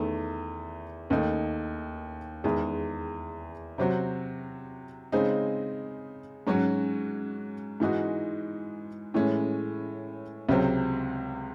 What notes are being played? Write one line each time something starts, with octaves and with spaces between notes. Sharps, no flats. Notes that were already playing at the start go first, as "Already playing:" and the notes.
Already playing: E2 D#3 A3
D#2 D#3 A3 D#4
E2 D#3 G#3
C3 F#3 C4 F#4
C#3 G#3 C4 D#4
G#2 F#3 C#4 F#4
G#2 E3 G#3 D#4 F#4
A2 E3 G#3 C#4
C#2 C3 F#3 C4